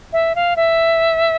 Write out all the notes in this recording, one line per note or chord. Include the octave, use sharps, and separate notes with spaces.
E5
F5
E5